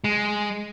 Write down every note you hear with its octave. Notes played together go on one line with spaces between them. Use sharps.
G#3